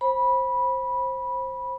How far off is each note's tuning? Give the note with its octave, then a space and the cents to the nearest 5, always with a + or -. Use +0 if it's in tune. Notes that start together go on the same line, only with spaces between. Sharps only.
C5 +20 B5 -15